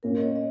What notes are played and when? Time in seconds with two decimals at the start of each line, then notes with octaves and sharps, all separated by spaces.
0.03 A#2 A#3 C#4 A#4
0.17 D#5
0.22 C#5
0.36 D#5